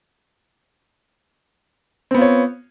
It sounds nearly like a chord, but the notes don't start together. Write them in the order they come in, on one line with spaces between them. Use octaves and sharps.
C4 B3 F4 C#5